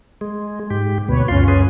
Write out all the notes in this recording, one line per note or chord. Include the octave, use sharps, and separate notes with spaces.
G#3
G#2 G4
D2 B2 B4 C#5
C#2 F#2 C#4 F4 C6
G#4 B4